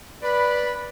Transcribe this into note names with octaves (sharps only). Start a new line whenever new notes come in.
B4 D5 B5